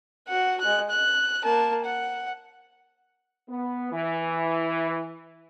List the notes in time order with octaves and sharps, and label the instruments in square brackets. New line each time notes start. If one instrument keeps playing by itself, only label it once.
[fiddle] F#4 F#5
G#3 F#6
F#6
A#3 A5
F#5
[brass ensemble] B3
E3